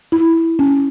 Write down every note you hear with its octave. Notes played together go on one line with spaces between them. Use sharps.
E4
C#4